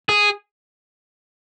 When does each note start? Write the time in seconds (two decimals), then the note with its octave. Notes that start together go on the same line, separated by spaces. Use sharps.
0.09 G#4